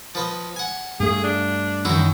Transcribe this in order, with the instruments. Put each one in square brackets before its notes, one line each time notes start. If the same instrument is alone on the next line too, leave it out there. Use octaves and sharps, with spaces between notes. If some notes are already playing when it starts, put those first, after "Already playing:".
[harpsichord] F3 B4 D#5
F#5 G#5
[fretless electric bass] G2 A3 [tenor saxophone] G#4
[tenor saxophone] D4
[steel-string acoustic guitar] F#2 D#3 [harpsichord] D#4 E4 F#4